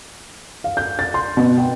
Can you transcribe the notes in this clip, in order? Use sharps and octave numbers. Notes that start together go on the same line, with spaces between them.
F5
G6
A6
C6
B2
G5